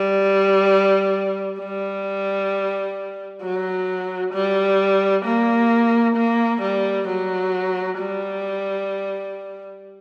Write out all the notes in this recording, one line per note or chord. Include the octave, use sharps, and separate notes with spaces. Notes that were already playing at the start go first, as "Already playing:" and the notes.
Already playing: G3
G3
F#3
G3
A#3
A#3
G3
F#3
G3